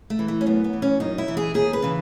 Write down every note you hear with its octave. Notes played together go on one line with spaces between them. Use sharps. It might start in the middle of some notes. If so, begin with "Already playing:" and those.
A3
E3
A3
C#4
F#2 B3
B3
E3
C#4
F#2 D#4
E4
E3
G#4
D#2 G#4
B4
C#3 E3